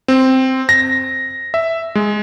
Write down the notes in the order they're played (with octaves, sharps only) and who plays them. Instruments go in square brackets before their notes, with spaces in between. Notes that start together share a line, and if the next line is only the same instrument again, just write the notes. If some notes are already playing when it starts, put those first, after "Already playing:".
[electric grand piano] C4
A#6
E5
G#3